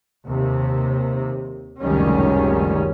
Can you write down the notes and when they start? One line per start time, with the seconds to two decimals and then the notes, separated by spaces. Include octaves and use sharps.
0.25 D#2 C3
1.80 F1 C#2 F#2 D#3 G3 C#4